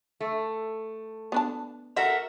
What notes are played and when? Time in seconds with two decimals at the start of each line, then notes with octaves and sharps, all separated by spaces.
0.20 A3
1.32 B3 D4 A5
1.97 F#4 A4 A#4 E5 A#5